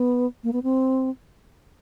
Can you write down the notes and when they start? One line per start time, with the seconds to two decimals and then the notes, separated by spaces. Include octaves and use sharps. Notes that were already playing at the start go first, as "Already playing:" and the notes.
Already playing: B3
0.44 A#3
0.53 B3
0.63 C4